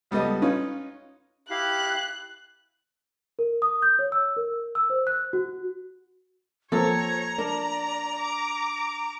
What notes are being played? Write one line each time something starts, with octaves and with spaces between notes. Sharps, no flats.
C#2 G3 B3 A4 D#5
C#4 D#4 F4 B4 C#5 D#5
E4 G4 F5 F#6
A#4
D#6
G6
C#5
E6
A#4
E6
C5
F#6
F#4
F3 A#3 C4 A4 C#5 A#5
D4 A#4 D5
D6